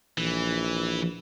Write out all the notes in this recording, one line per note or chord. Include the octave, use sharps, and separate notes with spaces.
A#1 E3